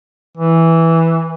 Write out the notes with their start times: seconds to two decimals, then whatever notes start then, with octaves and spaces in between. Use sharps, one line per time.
0.37 E3